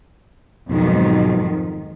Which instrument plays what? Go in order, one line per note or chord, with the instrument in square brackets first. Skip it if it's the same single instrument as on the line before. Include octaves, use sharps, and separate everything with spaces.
[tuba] B1 [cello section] F2 G#2 D#3